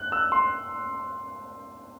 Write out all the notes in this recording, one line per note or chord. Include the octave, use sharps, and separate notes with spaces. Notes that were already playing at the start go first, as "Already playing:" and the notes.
Already playing: F#6
E6
C6